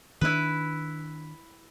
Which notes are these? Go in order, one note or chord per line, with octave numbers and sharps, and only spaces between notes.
D#3 C#4 D4 E4 B4